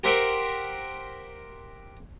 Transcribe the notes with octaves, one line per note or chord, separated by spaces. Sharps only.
G4 A#4 C5 E5 F#5 G5